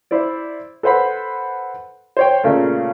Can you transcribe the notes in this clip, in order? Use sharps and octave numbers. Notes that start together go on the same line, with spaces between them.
E4 C5 D5
A4 B4 C5 F#5 B5
C5 C#5 G5
A#2 C#3 A3